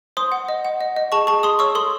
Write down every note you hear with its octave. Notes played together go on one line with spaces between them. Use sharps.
C5 C6 D#6
F#5
D#5
F#5
D#5
D#5
G#4 A5 C#6
G#4 A5 C#6
G#4 C6 D#6
C#5 C#6 E6
A4 C6 D#6